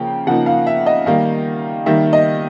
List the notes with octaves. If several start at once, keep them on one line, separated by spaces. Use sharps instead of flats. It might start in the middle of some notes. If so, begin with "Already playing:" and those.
Already playing: C#3 F3 A#3 G5
C#3 F3 A#3 D#4 F#5
F5
E5
D#5
D#3 G3 A#3 D#4 F5
D#3 G3 A#3 D#4 E5
D#5